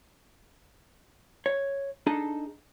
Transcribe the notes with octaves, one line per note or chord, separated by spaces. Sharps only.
C#5
D4 D#4 G#4 A4 D#5 A5